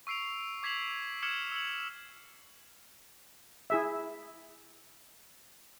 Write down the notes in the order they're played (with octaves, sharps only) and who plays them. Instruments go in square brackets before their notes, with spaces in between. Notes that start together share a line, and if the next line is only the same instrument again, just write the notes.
[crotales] C#6 E6 C7 D7 F7
D6 G#6 B6 C7 F7 F#7
D6 F6 G#6 C#7 E7 F#7
E6 F#7
[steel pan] E4 G#4 E5